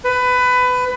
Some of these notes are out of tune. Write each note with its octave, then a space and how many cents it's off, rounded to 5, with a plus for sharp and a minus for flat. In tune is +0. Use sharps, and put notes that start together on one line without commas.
B4 +20